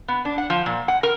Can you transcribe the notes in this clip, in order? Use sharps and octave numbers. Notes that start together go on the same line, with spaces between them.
B3
D4
F#5
F3
A#2
F#5
A#4